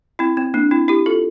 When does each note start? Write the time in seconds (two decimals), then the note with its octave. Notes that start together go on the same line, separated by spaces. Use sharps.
0.19 C4 E4
0.37 C4
0.54 A#3 D4
0.71 C4 E4
0.88 E4 G4
1.06 F4 A4